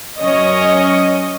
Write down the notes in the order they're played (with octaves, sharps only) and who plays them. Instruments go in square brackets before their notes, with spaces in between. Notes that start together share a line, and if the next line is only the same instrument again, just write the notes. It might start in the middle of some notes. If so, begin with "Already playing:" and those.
[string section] F#2 C#4 C#5 D#5